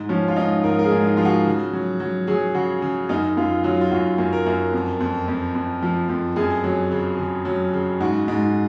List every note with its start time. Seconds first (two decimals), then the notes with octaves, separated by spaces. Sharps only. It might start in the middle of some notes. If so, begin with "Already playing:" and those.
Already playing: G#2
0.09 F3 C#4
0.28 F4
0.36 G#2 D#4
0.64 G#2 A#4
0.79 A#4
0.84 G#4
0.92 G#2
1.05 D#4
1.17 F3 F4
1.25 F#4
1.46 C#3
1.73 F#3
2.00 F#3
2.27 F#3 G#4
2.54 C#3 F#4
2.82 C#3
3.09 F#2 D#4
3.37 F#2 F4
3.64 F#3 F4
3.81 F4
3.91 F#2 F#4
4.18 F#2
4.33 A#4
4.46 F#2
4.73 F2
5.00 F2
5.28 F2
5.55 F2
5.82 F3
6.09 F2
6.36 F#2 G#4
6.64 F#3
6.91 C#3
7.19 C#3
7.45 F#3
7.73 C#3
8.00 G#2 F#4
8.28 G#2